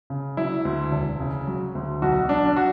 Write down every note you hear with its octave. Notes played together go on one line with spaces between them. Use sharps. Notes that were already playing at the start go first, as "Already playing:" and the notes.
C#3
F#3 E4
D2
E1
C#3
F#3
D2
B1 F#4
F#3 D4
F#4